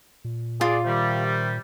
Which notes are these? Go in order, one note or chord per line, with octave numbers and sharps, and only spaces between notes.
A#2
F4 G#4 D5
C3 D#3 G3